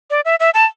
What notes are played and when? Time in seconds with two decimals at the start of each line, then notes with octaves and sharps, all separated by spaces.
0.10 D5
0.25 E5
0.40 E5
0.54 A5